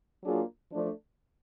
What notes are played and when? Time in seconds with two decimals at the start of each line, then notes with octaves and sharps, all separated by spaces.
0.24 F#3 A#3 D4 F4 G#4
0.72 F3 A3 D4